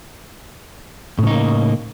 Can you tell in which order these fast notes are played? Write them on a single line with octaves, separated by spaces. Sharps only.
A2 C#3 D#4 A#3